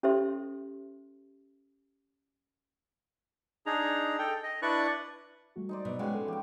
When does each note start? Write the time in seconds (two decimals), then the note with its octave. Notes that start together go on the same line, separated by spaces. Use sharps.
0.03 C#4 G4 A4 C5 E5 C6
3.66 D4 D#4 G#4 A#5
4.19 A4 G5
4.44 D#5
4.62 D4 E4 B4 D5 C#6 F#6
5.56 G3 A3 F#4
5.69 D#4 C5 D5
5.85 B2 F#3
5.99 C#3 G#3 F#4 B4 D#5 F5 G5
6.14 A4
6.28 F3 G4 G5